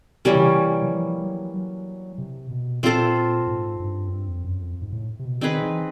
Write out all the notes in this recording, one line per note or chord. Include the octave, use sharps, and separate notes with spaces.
C3 E3 G3 A#3 C#4
C#3
C3
F#3
F3
F#3
F#3
C3
B2
A#2 C4 F4 A4 C5
G#2
G2
F#2
G2
F2
F#2
F2
G#2
A2
C3
B2
D#3 C4 D#4 G#4 B4
E3